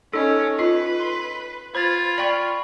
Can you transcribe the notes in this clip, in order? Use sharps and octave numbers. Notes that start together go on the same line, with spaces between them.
C#4 D#4 A4 D#5
F4 B4 D#5
C6
F4 C5 B5 G#6 A6
D5 G5 B5 C#6